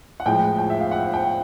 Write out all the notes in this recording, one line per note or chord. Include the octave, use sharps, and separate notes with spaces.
F#5
A2 F3 G#3 G5
G5
E5
F5
F#5
G5